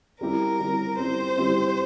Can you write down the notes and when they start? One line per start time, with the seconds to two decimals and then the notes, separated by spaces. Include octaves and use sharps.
0.21 G3 C4 E4 G4 A#4
0.59 G3 C4 E4 G4
0.98 G3 C4 E4 G4 C5
1.38 G3 C4 E4 G4